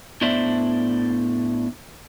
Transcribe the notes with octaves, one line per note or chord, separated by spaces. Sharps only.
A2 B3 D4 C5 D5 E5